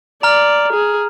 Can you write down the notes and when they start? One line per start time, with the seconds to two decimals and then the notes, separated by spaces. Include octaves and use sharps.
0.23 D5 A#5 F6
0.73 G#4